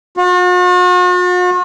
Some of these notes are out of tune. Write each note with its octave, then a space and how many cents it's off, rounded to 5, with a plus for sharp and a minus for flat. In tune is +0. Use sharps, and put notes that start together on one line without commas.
F#4 -45